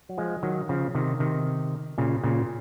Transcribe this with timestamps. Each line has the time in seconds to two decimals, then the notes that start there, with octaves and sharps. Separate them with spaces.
0.09 F#3
0.18 F3 G#3
0.43 D#3 F#3
0.69 C#3 F3
0.95 C3 D#3
1.20 C3 D#3
1.98 A#2 C#3
2.24 A#2 C#3